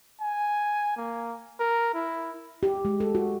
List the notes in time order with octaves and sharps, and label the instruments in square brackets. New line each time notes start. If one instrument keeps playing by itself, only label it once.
[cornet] G#5
A#3
A#4
E4
[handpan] G4
G#3
A4
F#4